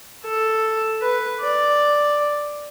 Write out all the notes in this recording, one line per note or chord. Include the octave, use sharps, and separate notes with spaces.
A4
B4
D5